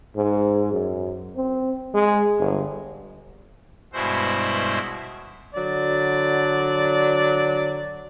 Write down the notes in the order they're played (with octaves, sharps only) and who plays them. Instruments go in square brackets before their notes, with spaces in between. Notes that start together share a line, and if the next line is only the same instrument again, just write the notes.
[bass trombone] G#2
F#2
C4
G#3
G1
[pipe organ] G2 B2 G#3 E4 F#4 C5
[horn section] D3 F#3 D5